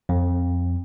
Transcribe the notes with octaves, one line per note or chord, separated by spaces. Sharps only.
F2